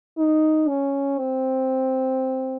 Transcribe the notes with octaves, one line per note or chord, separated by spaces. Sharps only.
D#4
C#4
C4